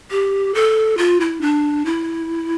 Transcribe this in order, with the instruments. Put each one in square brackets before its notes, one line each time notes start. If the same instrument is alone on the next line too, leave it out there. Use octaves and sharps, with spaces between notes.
[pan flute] G4
A4
F4
E4
D4
E4